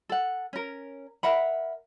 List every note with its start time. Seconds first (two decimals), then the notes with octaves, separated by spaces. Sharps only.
0.09 A4 F#5
0.53 C#4 A#4
1.23 A#4 E5 F#5 B5